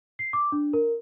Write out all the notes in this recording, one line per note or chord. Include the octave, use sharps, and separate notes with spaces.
C7
D6
D4
A#4